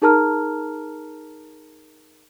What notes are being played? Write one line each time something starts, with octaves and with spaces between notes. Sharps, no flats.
D#4 G#4 A#4 A5 A#5 F6